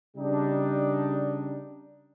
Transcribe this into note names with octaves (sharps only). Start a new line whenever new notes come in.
C#3 G3 D4 D#4